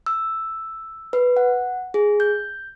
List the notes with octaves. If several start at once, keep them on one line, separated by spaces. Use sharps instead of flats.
E6
B4
F#5
G#4
G6